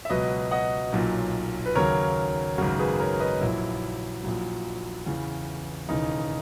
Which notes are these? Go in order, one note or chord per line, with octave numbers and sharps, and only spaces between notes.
E5
C#2 B2 F#3 B4 D#5
D#5 F#5
B1 A#2 F#3
B4
D#2 C#3 F#3 A#4 C#5
G#1 F#2 C#3 F#4 A#4
G#4 B4
A#4 C#5
B4 D#5
A#1 A#2 F#3 E4
A#1 A#2 F#3
E2 C#3 E3
E1 D#2 C#3 E3 D#4